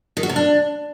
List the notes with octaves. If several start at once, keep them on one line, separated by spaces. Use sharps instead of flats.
D#3
F#4
C3
D4